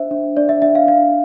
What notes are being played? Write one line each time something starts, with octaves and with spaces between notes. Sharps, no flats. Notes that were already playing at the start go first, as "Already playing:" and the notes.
Already playing: D4 C5 E5
D4
D4 D5
E5
D4 E5
F5
D4 F5